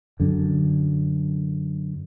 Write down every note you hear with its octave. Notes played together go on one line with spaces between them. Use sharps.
F#2 D3